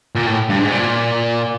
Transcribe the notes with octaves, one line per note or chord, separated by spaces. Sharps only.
A#2
A2
G2
G#2
A#2